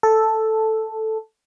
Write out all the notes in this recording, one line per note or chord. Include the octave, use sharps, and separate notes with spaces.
A4